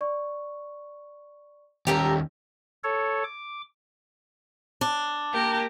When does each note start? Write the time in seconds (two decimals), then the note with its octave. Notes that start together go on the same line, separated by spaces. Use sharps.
0.01 D5 C#6
1.87 D#2 C#4 G4 A4 A#4
2.84 A4 C#5
3.24 D6
4.81 D4
5.33 A#3 G4 A#4